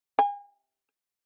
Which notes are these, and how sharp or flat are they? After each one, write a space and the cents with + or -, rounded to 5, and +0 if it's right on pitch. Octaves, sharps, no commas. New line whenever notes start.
G#5 -40